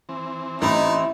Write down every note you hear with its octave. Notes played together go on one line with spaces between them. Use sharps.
E3 C4
A1 D#4 E4